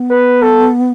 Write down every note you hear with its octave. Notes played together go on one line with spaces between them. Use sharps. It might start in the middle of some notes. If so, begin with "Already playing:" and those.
Already playing: B3
B4
A4